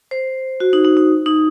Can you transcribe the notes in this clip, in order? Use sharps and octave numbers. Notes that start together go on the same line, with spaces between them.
C5
F#4
D#4
D#4
D#4
D#4